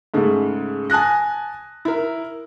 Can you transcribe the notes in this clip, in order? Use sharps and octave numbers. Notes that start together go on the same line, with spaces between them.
G#2 C#3 A3
G#5 A5 D#6 F#6 A#6
E4 A#4